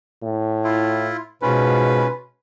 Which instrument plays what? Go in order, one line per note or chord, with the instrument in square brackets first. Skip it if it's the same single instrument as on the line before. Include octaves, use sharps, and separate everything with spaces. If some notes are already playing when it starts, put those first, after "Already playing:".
[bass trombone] A2
[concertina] E4 F4
[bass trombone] G#2 [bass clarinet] B2 [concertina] C#4 F4 [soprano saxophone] B4